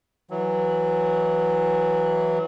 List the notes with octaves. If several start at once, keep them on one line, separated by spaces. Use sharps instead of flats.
E3 F#3